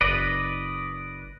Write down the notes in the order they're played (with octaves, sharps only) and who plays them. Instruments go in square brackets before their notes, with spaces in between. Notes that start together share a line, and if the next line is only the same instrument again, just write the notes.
[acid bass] F#1 [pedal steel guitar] B4 D5 D#5